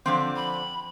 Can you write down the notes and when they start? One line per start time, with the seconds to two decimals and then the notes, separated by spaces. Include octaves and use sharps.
0.06 D3 F3 C4 D6
0.36 B5